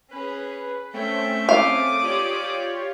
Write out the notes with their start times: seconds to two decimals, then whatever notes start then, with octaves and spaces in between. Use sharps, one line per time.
0.11 C#4 G#4 B4
0.94 A3 C4 C#4 E5 G5
1.49 F5 D6 D#6
2.02 F4 G4 C#5 D5